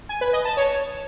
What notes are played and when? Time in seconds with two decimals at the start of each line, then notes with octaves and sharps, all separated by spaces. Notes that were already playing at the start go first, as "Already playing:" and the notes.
0.09 G#5
0.21 B4
0.33 D#5
0.45 A5
0.57 C#5